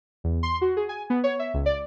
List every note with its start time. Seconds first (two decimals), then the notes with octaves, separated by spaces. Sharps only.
0.24 E2
0.43 C6
0.61 F#4
0.77 G#4
0.89 G#5
1.10 B3
1.24 C#5
1.39 E5
1.54 C#2
1.66 D5